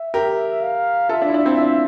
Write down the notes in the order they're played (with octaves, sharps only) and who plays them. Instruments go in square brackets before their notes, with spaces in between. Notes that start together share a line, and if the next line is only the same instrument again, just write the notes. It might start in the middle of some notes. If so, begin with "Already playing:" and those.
Already playing: [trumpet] E5
[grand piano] G4 A#4
[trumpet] F5
[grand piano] F4 A4 [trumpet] E5
[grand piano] D4 F4
E4
D4
C4 E4
D4 F4